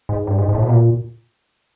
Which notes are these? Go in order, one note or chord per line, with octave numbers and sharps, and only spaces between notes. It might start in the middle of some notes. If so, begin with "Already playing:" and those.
G#2
G2
G#2
G#2
A2
B2
A#2